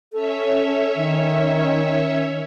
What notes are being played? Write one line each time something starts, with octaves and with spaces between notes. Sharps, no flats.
C#4 A4 C#5 E5
D#3